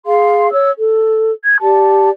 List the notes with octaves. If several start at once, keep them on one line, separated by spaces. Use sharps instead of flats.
G#4 F5 C6
C#5 E6
A4
G#6
G4 D5 A5